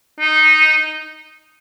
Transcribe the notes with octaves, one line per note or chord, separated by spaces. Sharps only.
D#4